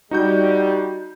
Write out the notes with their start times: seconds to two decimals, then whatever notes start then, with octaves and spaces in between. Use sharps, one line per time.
0.11 G3 D#4 F#4 G6